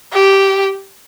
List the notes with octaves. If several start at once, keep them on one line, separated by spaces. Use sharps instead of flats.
G4